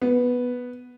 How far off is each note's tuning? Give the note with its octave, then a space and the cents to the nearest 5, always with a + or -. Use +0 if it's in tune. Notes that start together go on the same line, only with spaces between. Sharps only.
B3 -5